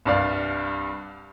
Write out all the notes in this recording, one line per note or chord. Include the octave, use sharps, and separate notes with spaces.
C2 G2 D5 F5